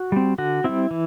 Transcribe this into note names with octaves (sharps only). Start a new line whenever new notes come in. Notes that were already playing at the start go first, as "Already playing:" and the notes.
Already playing: F#4
G3 C4
D3 F#4
G3 C4 E4
E3